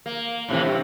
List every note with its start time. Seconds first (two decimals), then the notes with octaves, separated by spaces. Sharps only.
0.06 A#3
0.49 A2 C3 E3
0.63 G2 C3